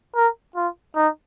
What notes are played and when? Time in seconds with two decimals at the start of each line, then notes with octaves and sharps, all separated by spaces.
0.16 A#4
0.56 F4
0.96 D#4